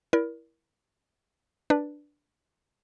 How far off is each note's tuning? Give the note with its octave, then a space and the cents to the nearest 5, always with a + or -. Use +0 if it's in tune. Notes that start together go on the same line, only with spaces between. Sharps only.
E4 +0 A#4 +20 D5 -25
D4 +0 B4 -10 D5 +0